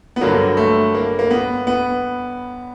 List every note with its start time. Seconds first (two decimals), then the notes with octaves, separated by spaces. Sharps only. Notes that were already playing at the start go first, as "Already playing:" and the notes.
0.16 B3
0.21 G2 D3 F#3 A#3
0.57 A3
0.95 A#3
1.19 A#3
1.30 B3
1.67 B3